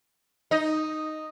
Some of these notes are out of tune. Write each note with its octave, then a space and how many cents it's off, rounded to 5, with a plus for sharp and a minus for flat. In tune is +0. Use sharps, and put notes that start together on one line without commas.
D#4 -5 D#5 +0